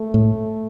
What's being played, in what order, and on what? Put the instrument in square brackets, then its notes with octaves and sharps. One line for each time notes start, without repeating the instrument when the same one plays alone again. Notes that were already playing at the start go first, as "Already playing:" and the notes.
Already playing: [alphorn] A3
[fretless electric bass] A2